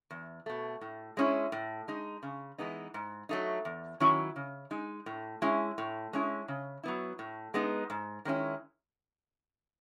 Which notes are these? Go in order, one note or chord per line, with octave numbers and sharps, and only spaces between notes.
E2
B2 A3
A2
G#3 C#4 E4
A2
G#3 D#4
C#3
E3 G#3 B3 D#4
G#2
F#3 A3 D#4
E2
D#3 F#3 C#4 E4
C#3
G#3 D#4
A2
G#3 C#4 E4
A2
G#3 C#4 E4
C#3
F#3 B3 E4
A2
G#3 B3 D#4
G#2
D#3 G#3 C#4 E4